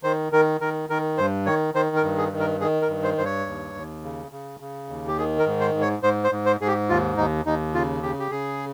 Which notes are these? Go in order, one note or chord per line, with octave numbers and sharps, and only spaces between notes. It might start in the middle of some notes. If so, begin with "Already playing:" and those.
D#3 C5
D#3 A#4
D#3 A#4
D#3 A#4
G2 C5
D#3 C#5
D#3 C5
A#4
G2
G#4
D#3
A#4
D#3 G#4
A#4
G2
C5
G2 C5
C#5
D#2
D#2
C#3
C#3
C#3
D#2
G4
D#3 G#4
A#4
G#2
C5
G#2
C#5
G#2 C5
C5
G#2
C5
G#2 G#4
G4
D#2 F4
D#2 D#4
D#2 D#4
C#3 F4
C#3 G4
G4
C#3 G#4